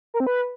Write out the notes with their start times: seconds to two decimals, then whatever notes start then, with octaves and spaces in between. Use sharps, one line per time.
0.14 A#4
0.20 C4
0.27 B4